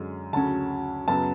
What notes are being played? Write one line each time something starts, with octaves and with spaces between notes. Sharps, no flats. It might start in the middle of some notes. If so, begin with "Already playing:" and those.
Already playing: F#2 D3 G#3
D2 C#3 F#3 C#4 A5
F#2 C#3 F#3 B3 A5